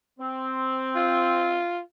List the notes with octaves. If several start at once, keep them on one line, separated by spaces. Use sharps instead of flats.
C4
F4